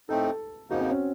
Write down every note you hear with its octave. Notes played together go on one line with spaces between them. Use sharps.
A2 A3 C4 D#4 A4
A4
F2 C#3 F3 A#3 D#4 F#4
C4
C#4